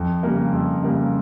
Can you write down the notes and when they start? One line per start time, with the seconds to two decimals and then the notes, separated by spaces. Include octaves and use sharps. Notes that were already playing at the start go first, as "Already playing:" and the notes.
Already playing: F2
0.23 C#3 G3 A#3
0.53 F2
0.82 C#3 G3 A#3